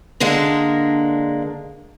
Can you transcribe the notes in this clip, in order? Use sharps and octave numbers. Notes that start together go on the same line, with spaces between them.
D3 G#3 A#3 D4